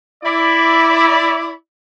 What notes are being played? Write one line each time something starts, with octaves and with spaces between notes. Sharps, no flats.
E4 D5